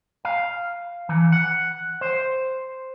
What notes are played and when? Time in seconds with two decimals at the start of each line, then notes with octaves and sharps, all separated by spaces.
0.25 F5
1.09 E3
1.32 F#5
2.01 C5